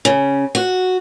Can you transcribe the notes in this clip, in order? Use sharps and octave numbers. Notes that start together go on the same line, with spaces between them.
C#3
F#4